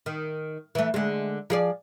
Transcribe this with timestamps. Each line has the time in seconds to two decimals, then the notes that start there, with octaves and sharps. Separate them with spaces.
0.06 D#3
0.75 E3 A3
0.94 D3 G#3
1.50 F3 G#4 D5